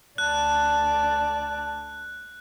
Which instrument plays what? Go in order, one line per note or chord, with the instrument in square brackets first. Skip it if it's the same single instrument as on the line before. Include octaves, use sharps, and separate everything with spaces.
[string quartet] D2 D5 A5 [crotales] F#6